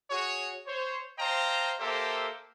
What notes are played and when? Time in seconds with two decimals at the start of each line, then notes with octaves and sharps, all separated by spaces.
0.11 F#4 G#4 C#5
0.67 C5 C#5
1.18 C5 D#5 F5 G5 A5 A#5
1.80 A#3 G4 A4 A#4 C5 E5